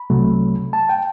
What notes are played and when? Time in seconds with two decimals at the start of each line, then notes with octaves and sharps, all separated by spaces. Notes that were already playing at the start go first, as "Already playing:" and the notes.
Already playing: B5
0.10 C2 C3 F#3 A3
0.73 A5
0.89 G5